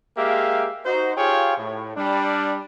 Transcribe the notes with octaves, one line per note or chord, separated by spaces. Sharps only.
G#3 A#3 G4 G#4 E5 F5
D#4 F#4 C5
F4 G4 G#4 C#5 F5 G5
A2
G3 D4